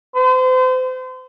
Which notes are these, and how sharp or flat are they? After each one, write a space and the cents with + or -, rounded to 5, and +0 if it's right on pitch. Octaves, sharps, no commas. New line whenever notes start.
C5 -35